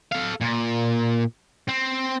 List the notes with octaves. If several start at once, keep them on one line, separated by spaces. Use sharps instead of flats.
A4 F5
A#2
C4